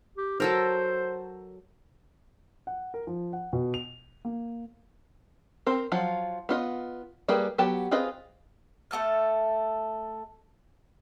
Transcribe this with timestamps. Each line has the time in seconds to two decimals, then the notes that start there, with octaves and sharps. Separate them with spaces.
0.17 G4
0.40 F#3 A4 A#4 C5
2.67 F#5
2.94 A#4
3.07 F3
3.33 F#5
3.53 B2
3.74 F7
4.25 A#3
5.67 C4 A#4 C5
5.92 F3 F#3 F4
6.49 B3 F4 D#5
7.28 G3 A#3 G#4 B4 G5
7.58 F#3 B3 G4 A5
7.91 C4 F4 G#4 B4 D#5
8.91 A3 B3 A4 F6